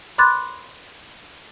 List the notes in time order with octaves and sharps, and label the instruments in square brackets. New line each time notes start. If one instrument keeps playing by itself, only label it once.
[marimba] B5 C6 D6 F#6 A6